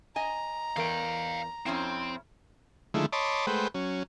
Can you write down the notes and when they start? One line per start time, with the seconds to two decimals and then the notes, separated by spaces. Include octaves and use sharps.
0.16 D#5 G#5 A#5
0.77 E2 A#4 F5 G5
1.66 F2 C4 C#4 E4
2.94 D3 D#3 F3 G#3 A3 E4
3.13 C#5 D#5 A5 B5 C6 D6
3.47 G#3 A3 B4 C5 F#5 G5
3.75 F#3 C#4